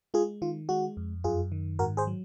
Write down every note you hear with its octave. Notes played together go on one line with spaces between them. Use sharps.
G#3 F4 G#4
D#3 F4
G#3 F#4
F2
F#2 F4 G#4
D#3
G#2 F#4 A#4
G#4 C5
F#3